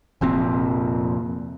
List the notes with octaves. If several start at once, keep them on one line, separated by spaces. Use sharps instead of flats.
F1 F2 A#2 C4